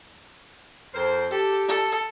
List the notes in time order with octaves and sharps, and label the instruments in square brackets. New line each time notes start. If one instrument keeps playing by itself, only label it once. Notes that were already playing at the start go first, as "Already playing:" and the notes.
[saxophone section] F2 A#4 C5
[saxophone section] G4 [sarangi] A4
[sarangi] A4